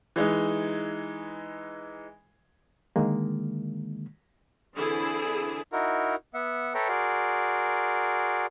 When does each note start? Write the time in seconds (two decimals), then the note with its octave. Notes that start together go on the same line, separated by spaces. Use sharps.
0.16 E3 G#3 D#4
2.96 D3 D#3 G#3 A#3
4.76 D3 E3 C4 E4 G#4
5.73 D#4 E4 F#4 A#4
6.34 B3 E5 F#5
6.74 A4 B4 C#5 E5 G5 A#5
6.89 F#4 G#4 A#4 D5 C6